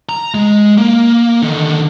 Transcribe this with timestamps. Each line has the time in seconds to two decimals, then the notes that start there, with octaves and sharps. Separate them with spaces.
0.09 A#5
0.34 G#3
0.78 A#3
1.42 D3 D#3